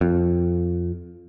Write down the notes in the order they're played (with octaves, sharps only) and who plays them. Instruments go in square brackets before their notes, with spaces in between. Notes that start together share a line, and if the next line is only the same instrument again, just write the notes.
[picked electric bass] F2